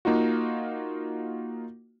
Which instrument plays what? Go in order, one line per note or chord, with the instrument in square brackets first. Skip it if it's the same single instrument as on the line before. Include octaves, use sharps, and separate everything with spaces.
[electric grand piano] A#3 D#4 F4 F#4